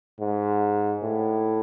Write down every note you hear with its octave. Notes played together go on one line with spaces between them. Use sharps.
G#2
A2